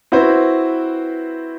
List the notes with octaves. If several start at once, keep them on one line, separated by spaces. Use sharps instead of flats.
C4 E4 F#4 B4 C5